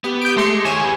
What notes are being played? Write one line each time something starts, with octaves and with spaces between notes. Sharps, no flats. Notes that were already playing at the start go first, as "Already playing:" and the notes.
B3 G4
G6 D7
G#3 A3 C6 C#7
D#3 C#5 G#5 E7
G#4 B4